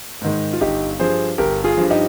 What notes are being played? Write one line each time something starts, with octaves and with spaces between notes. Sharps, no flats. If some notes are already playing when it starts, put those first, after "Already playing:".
G#2 D#3 G#3
F4
G1 D#4 G4
G2 F3 G#4 C5
G1 G4 A#4
F4 G#4
G2 F3
D#4 G4